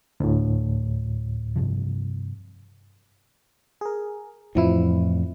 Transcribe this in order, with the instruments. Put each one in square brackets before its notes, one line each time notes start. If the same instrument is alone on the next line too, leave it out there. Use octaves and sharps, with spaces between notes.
[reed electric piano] D2 A2
[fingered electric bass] G2 C3 F3
[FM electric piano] G#4 A#4
[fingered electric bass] F2 A2 [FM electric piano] E3 F3 E4